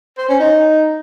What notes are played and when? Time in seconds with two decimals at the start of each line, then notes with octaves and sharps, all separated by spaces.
0.18 C5
0.29 C#4
0.40 D#4